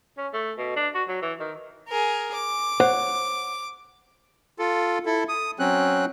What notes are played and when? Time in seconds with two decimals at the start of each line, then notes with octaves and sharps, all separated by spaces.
0.18 C#4
0.33 A3
0.58 B2
0.76 D4
0.95 F#4
1.08 F#3
1.22 E3
1.40 D#3
1.88 G#4 A#4
2.34 D6
2.80 C5 C#5 F#5
4.59 F4 A4
5.06 E4 A4
5.29 D#6
5.59 F#3 C4 C#4 F#6